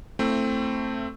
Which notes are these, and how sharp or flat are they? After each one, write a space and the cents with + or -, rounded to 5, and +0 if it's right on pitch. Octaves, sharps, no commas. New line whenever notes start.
A3 +15 C4 +5 E4 +30